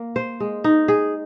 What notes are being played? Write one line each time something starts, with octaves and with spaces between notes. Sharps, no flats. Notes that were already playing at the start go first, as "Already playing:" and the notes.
Already playing: A#3
C5
G#3
D#4
G#4